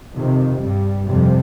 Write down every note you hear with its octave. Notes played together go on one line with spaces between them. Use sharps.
F2 C3 D#3
G2 G3
F2 C3 G3